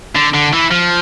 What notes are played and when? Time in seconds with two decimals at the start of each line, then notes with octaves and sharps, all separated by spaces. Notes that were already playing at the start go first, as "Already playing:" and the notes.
0.16 D3
0.34 D3
0.53 E3
0.71 F3